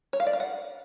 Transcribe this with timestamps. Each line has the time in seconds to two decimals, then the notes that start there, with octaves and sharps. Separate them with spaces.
0.13 C#5
0.20 F5
0.27 D5
0.33 F5
0.40 F#5